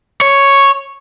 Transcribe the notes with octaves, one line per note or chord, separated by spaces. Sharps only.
C#5